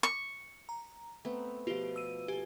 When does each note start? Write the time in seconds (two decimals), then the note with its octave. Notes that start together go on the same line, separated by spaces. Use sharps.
0.03 C#6
0.69 A#5
1.25 A3 B3 C4
1.67 B2 F3 F4 G4
1.96 E6 D#7
2.28 G4 A4 G#5